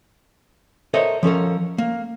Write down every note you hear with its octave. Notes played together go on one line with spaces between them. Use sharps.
A4 A#4 C5 C#5 D#5 E5
F3 C#4 A4 A#4
A#3